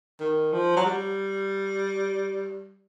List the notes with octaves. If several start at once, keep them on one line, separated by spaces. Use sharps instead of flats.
D#3
F3
F#3
G3